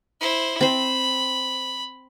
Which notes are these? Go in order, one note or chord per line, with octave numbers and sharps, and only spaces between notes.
E4 C5
C4 C5 B5